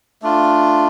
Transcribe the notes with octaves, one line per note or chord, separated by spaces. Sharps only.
A3 D4 F4